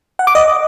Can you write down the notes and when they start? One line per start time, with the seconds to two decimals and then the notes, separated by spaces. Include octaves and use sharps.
0.19 F#5
0.27 D6
0.35 D#5